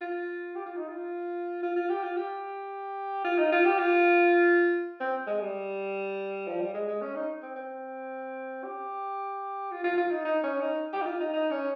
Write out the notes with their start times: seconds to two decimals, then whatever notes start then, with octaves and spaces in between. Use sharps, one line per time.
0.01 F4
0.55 G4
0.66 F4
0.77 D#4
0.89 F4
1.63 F4
1.76 F4
1.90 G4
2.03 F4
2.17 G4
3.24 F4
3.39 D#4
3.52 F4
3.65 G4
3.79 F4
5.00 C4
5.27 G#3
5.41 G3
6.48 F3
6.61 G3
6.74 G#3
6.88 G#3
7.02 C#4
7.15 D#4
7.42 C4
7.56 C4
8.64 G4
9.71 F4
9.84 F4
9.98 F4
10.11 D#4
10.25 D#4
10.43 C#4
10.61 D#4
10.93 G4
11.02 D#4
11.06 F4
11.20 D#4
11.33 D#4
11.51 C#4